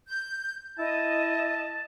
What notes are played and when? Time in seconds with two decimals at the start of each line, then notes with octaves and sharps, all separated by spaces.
0.08 G6
0.79 E4 D#5 A5